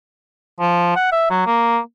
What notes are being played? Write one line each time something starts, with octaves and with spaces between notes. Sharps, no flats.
F3
F#5
E5
F#3
A#3